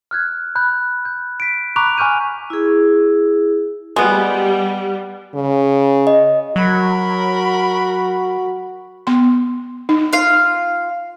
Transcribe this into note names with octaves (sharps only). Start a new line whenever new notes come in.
F6 F#6 G#6
B5 F#6 G6
G6
B6 D7
A#5 B5 C#6 D6 F#6 F7
G#5 C#6 F6 G6 D#7
E4 G#4
G3 G#3 B3
C#3
D#5
F#3 F#4 A#4 B5
B3 C6
D#4
F4 F5